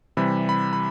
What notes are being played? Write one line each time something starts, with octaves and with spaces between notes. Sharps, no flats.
C3 E3 G3 B5
B5
B5